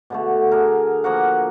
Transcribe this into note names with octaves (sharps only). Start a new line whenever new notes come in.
B2 D3 A3
D4 G#4 A#4
F3 A#3 F#4 F#5